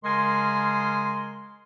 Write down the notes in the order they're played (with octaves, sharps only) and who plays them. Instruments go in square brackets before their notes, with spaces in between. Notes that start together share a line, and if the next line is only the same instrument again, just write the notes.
[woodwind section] C#3 G#3 A#4 G#5 C6